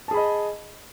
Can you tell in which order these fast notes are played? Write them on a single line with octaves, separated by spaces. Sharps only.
A5 G#4 B5 D#5